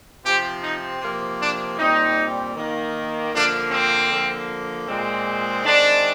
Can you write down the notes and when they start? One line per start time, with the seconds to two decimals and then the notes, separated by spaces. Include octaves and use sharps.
0.25 C3 F3 C4 G4
0.62 D#4
1.01 C3 F3 A#3
1.40 D4
1.78 A#2 G3 C4 D#4
2.56 D#3 A#3
3.33 D3 F3 A#3 D4
3.71 C4
4.10 D3 F3 A#3
4.87 A#2 G#3 C4
5.64 D#3 G#3 C4 D4